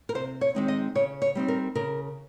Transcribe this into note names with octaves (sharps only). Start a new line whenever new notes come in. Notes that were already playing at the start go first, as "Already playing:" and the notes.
A#4
C3 C5
C#5
D#3 G#3 C4 D#4
D#5
C#3 C#5
C#5
G3 C4 D#4
A#4
C#3 A#4